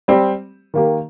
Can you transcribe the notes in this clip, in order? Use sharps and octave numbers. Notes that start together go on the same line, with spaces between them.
G3 C4 G4
D#3 A#3 G4